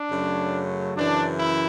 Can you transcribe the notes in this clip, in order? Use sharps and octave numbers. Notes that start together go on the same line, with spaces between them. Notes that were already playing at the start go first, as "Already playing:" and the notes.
Already playing: D4
F#2 C#3 F#3 A3
F#2 C#3 E3 D4
E4